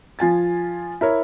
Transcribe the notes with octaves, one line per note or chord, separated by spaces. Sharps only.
F3 F4 G#5 A6
E4 A#4 C#5